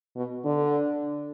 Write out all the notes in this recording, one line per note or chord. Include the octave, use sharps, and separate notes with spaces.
B2
D3